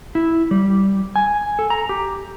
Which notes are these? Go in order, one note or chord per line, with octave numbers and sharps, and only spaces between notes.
E4
G3
G#5
A4
A#5
G4